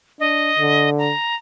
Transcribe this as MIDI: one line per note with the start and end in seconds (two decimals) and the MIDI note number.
0.20 0.51 62
0.20 0.90 75
0.59 1.11 50
0.99 1.36 82